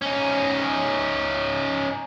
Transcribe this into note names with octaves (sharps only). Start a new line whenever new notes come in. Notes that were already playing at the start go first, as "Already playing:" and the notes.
C#4 D#4